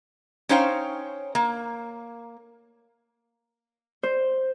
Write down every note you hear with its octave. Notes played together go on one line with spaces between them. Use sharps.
C#4 D#4 C5 C#5 F5 G5
A#3
C5